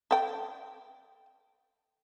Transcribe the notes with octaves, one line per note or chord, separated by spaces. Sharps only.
A4 G5